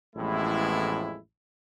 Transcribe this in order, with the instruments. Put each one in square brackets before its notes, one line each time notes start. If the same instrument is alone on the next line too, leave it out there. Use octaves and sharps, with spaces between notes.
[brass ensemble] A1 F2 A2 G#3 B3 E4